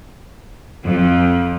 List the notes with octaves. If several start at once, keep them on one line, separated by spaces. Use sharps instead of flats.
F2